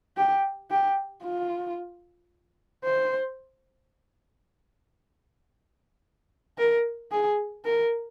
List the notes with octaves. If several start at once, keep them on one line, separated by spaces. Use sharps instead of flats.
G4
G4
F4
C5
A#4
G#4
A#4